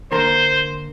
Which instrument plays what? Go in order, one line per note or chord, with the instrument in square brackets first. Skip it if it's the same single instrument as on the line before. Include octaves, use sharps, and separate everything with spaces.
[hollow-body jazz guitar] D3 A#3 A#4 [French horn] C5